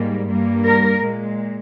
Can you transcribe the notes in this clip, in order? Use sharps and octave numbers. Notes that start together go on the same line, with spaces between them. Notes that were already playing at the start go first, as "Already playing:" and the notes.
Already playing: G#2 G3 A#3
G2 G3 A#3
A#4
A#2 G#3